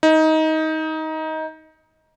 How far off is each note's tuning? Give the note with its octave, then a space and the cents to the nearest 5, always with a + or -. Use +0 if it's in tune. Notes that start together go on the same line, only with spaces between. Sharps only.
D#4 +20